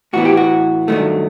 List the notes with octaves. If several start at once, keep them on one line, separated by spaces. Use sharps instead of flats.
A2 E3 B3 F#4
G4
F#4
G2 D#3 F#3 A3